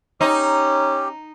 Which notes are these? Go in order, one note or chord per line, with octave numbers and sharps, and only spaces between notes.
C#4 D#4 G4